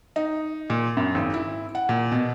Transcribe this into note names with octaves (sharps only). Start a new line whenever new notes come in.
D#4
A#2
F#2
G#1
E4
F#5
A#2
B2